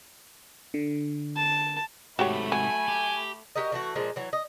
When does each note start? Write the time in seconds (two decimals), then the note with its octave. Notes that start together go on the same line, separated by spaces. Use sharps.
0.74 D3
1.36 A5
2.19 G#2 C3 A3 F#4 G4 C#5 B5
2.52 F#3 G#5
2.88 G4
3.56 F#4 G4 A#4 D#5
3.72 E3 A3 F#4
3.95 A#2 F3 G#3 A#3
4.16 E3 F#3
4.33 D#5